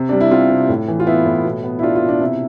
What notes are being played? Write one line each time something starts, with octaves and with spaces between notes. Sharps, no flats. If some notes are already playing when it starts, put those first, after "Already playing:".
Already playing: C3
G3 D4
E4
C4 F4
C3
A2
E3
F4
B3 E4
A2
B2
B3
E4
D4 F4
F4
B2
D4
C3 E4